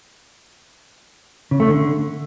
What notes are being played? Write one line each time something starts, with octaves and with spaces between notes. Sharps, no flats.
C#3
A3
D3